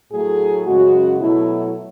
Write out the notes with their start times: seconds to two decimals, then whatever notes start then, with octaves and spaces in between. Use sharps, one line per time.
0.11 A2 F#3 A3 G#4
0.65 F#2 C#3 G#3 F#4
1.20 B2 F#3 A3 E4